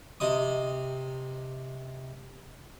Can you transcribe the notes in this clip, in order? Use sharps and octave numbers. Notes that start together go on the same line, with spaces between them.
C3 D#5 D#6